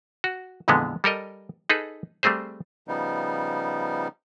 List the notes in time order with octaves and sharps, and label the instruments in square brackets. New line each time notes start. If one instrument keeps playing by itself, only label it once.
[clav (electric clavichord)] F#4
F2 A#2 D3 E3 G#3 B3
G3 A4 A#4 D#5
D#4 G#4 A4 B4
G3 A3 C4 G#4 C5
[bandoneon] C#3 F3 G3 B3 D#4